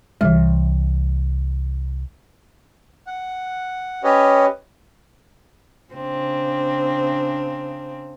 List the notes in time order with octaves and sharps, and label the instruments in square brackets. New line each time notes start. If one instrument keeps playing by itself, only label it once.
[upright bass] C2 [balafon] E3 G3
[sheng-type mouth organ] F#5
C#4 G4 B4 C#5 D#5
[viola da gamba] C#3 C4 D4